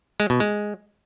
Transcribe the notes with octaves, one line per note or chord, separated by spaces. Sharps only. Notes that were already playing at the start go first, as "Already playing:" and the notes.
G#3
B2
G#3